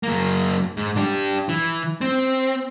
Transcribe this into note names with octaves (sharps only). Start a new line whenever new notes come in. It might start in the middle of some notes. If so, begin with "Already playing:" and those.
F#2 A#3
G#2
D4 G4
E3
C4